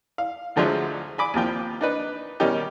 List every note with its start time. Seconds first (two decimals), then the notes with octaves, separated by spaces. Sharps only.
0.18 F5
0.56 D2 D3 F3 F#3 G#3 A3
1.18 G#5 B5 D6
1.34 D#2 C3 F3 G5
1.81 D4 D#4 B4
2.40 B2 D#3 G3 C#4 D#4 G4